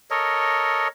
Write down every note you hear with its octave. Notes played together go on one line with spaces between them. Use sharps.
A4 A#4 C#5 D#5